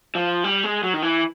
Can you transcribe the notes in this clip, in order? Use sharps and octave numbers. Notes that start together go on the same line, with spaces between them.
F3
G3
G#3
F#3
D#3
E3